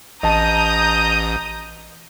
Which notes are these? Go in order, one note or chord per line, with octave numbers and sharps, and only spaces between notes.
A1 D#5 A5 A#5 D#6 G6